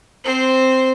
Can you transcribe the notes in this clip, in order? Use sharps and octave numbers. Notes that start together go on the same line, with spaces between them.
C4 C5